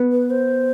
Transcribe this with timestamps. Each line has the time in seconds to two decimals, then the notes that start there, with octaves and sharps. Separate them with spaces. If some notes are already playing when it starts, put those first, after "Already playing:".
Already playing: B3
0.12 B4
0.30 C5